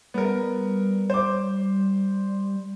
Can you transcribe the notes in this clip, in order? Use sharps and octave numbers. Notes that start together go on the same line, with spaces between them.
G3 B3 A#4
C5 D6